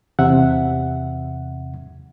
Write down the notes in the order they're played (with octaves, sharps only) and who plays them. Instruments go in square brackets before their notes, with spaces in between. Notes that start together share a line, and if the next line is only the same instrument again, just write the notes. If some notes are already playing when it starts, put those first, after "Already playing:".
[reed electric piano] E2 C3 E5 F#5